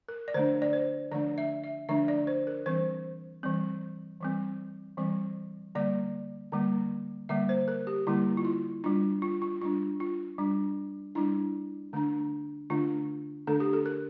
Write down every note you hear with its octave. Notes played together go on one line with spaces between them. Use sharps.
A#4
D5
D3 F3 A3 D4 C5
D5
C5
D3 F3 A3 D4 D5
E5
E5
D3 F3 A3 D4 E5
D5
C5
A#4
E3 G3 C4 C5
E3 G3 C4
E3 G3 C4
E3 G3 C4
D3 G3 A#3 D5
D3 G3 A#3
D3 G3 A#3 E5
C5
A#4
G4
D3 G3 A#3 E4
F4
E4
G3 D4 F4
F4
F4
G3 D4 F4
F4
G3 D4
G3 D4 E4
D3 A3 D4
D3 A3 D4 F4
D3 A3 D4 A4
G4
A4
A#4